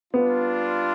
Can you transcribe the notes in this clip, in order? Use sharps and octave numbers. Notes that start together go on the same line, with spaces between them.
G3 B3 D4 F4